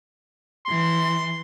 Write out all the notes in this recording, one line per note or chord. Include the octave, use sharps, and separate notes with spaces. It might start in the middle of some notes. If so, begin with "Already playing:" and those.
E3 C6